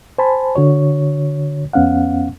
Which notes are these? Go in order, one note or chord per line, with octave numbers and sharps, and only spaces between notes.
C5 G#5 A5 B5
D3 F#4 C#5
F2 B3 C#4 F5 F#5